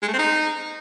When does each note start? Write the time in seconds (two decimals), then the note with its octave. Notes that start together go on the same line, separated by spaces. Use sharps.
0.02 G#3
0.08 A3
0.13 C4
0.19 D#4